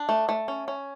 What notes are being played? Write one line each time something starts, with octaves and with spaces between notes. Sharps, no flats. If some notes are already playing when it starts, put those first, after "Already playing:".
Already playing: D4
A3
A3
C#4
C#4